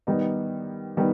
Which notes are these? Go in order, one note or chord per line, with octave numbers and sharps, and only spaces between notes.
D#3 G3 B3 D#4
D#3 G3 B3